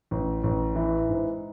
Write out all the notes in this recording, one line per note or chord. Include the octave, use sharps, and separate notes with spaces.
A1
A1
E3
G#2